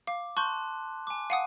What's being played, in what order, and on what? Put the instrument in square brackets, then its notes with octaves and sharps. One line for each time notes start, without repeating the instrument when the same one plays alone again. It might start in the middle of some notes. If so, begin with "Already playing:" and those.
[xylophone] F5 [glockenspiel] D6
[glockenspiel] A5 C6 F#6 [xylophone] C#6 G6
[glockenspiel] G#5 D6
[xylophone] F5 F#5 D#6 [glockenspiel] D#7